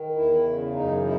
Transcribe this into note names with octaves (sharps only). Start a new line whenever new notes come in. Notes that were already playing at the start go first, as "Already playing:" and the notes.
Already playing: D#3
E2 E4
C#3
F#2 D#4
E4